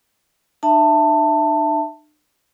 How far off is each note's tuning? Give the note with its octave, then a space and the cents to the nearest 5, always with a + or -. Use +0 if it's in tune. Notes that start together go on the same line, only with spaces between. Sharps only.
D4 +45 E5 +5 A5 +20